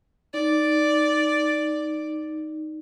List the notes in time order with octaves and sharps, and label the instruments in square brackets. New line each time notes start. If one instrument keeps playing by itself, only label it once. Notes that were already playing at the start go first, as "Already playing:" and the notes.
[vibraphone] D#4 [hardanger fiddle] D5